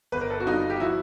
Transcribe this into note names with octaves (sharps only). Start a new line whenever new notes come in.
G1 B4
A#4
A4 B4
F#4
G2 D#4 F4
G4
F3 E4 F#4